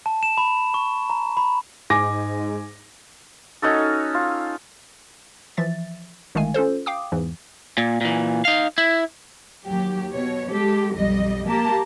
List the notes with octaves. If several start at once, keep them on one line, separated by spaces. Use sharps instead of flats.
A5
E7
B5
C#6
A#5
B5
G#2 G#5 D6 A#6
C#4 D#4 F#4 A4
F4
E3 F3 E5 A6
G1 D#3 G#3 A3 F5 G#5
C#4 F4 A4 C5
F5 G5 D6 D#6
E2 G#2 E3
A#2
A#2 E3
D#4 F5
E4
D#2 F#3 G4
B2 C#5
G#3 G4 A4
B1 F2 G3 D#5
A#3 G4 A5 A#5